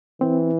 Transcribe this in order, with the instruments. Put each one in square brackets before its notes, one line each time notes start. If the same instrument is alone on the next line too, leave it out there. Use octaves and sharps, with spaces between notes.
[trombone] E3 [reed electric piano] C4